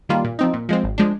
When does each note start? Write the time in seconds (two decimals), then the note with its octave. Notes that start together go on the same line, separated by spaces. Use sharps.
0.09 D#3 G3 A#3 F4
0.24 A#2
0.39 F3 C4 D#4
0.53 A#2
0.69 F3 G#3 C4
0.84 G#1
0.98 F3 G#3 D4